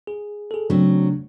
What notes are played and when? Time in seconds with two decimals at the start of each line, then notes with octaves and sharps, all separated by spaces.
0.07 G#4
0.51 G#4 A4
0.70 C#3 F#3 A3 C4 D4